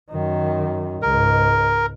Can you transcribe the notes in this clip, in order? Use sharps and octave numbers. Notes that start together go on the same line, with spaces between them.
F#2 D#3
C#2 G#2 A#4